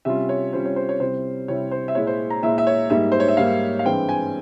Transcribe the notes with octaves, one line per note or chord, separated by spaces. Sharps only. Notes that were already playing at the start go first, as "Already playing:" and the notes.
C3 G3 C#4 F4 E5
C#5
C3 G3 C#4 F4 C5
C#5
C5
C#5
C3 G3 C4 E4 C5
C3 G3 C4 E4 C#5
C5
E5
A#2 G#3 E4 C#5
C5
A#5
A#2 G#3 E4 E5
E5
C#5
G#2 G3 A#3 E5
C5
C#5
E5
G#2 G3 A#3 F5
F5
G2 E3 G#3 C4 G5
G#5